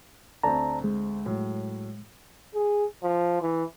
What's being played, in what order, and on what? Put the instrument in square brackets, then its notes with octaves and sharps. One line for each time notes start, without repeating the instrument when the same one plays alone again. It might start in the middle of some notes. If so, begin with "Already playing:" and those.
[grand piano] D2 C4 [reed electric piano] D5 A5 A#5
[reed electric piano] G#3
[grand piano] A2 F#3
[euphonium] G#4
F3
E3